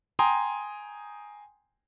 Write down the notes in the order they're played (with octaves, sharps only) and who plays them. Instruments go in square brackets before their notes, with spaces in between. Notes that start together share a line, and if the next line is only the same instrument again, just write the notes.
[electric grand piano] G5 G#5 A#5 C6 D#6